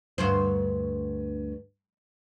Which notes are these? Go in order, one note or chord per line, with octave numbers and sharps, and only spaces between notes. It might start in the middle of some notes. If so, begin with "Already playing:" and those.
D2 G2 C5